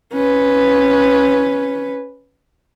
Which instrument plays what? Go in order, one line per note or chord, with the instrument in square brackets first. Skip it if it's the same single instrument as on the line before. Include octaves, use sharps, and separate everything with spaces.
[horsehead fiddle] C#4 B4